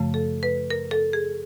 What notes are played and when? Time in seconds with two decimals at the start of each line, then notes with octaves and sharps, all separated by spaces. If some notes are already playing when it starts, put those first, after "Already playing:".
Already playing: F#2 C#3 F3 A3
0.14 A4
0.43 B4
0.70 A#4
0.91 A4
1.13 G#4